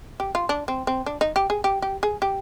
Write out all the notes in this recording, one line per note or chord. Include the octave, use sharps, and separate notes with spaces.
G4
F4
D4
C4
C4
D4
D#4
G4
G#4
G4
G4
G#4
G4